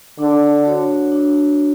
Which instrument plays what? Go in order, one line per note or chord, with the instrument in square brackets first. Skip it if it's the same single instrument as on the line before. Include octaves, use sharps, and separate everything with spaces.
[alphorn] D3 [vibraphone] D4
[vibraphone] F#4 C#5
D4